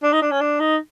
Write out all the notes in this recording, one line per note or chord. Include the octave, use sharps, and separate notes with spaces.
D4
D#4
D4
C#4
D4
D#4